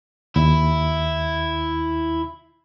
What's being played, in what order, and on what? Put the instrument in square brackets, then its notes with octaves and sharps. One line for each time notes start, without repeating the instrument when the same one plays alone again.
[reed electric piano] D#2 [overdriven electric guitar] E4